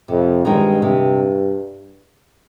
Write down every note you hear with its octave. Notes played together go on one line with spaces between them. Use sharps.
F2 C3
G2 D#3 G#3 C4 D#4
G2 C3